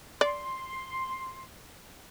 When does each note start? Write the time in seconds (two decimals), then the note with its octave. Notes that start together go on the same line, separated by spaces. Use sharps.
0.21 D5 C6